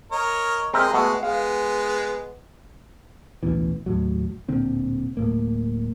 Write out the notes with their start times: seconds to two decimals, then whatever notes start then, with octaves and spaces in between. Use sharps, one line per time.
0.12 A#4 C#5 D#5
0.73 G#3 C4 A#4 D#5 E5
0.93 G#3 A3 B3 F#4
1.23 G#3 B3 F5
3.43 A1 D2 B2 E3
3.86 D#2 A2 F#3
4.48 D1 A#2 D3 C4
5.17 D1 A2 A#3